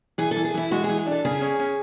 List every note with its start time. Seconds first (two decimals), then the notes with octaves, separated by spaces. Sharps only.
0.18 E3 G#4
0.31 E3 A4
0.44 G#4
0.54 E3 E4
0.71 G#3 F#4
0.84 E3 G#4
1.06 D4
1.11 A4
1.25 C#3 G#4
1.41 C#4
1.60 C#4